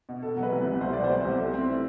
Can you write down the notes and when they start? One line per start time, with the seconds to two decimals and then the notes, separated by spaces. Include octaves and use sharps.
0.09 B2
0.22 B2 A4
0.37 F#3
0.43 B4
0.52 C2
0.66 C2
0.81 B2 C5
0.93 F#3 D5
1.04 C5
1.10 C2
1.25 C2
1.38 A3
1.54 C4
1.68 E4